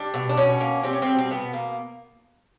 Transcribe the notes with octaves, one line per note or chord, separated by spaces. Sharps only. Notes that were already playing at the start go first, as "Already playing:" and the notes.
Already playing: G3 D4
B2
D4
B2 C#4
A#3
G3 C4
C#4
C4
B2
C4
B2 B3
A#3